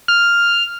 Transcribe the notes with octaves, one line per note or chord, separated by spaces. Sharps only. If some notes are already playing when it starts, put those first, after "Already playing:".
F6